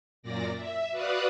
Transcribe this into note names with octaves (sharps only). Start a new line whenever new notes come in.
F#2 A#2 D5 A#6
E5
F#4 B4 D5 F5 F#5 D#6